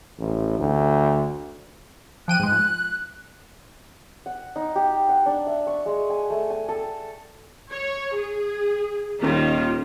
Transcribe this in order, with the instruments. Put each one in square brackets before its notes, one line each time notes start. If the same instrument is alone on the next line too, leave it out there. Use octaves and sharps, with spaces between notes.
[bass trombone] A1
D2
[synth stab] F3 G5 D#7 [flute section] F#6
[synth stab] G#2 G#3
F3
[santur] F#5
D#4
G4
F#5
D4
E5
C#6
G#3
G#5
A3
G#5
A4
[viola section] C#5
G#4
[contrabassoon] D#1 [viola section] D#3 G3 F4